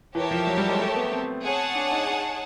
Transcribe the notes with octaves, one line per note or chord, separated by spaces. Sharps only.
E3 G4 A#4 C#5 E5 A5
F3
F#3
G3
G#3
A3
B3
C4
G#4 C#5 F#5 A5
D4
D#4
D#4